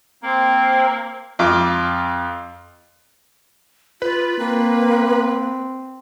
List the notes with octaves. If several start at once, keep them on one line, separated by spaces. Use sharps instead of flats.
A#3 C4
F2 F4 D6
F4 B4
A#3 C4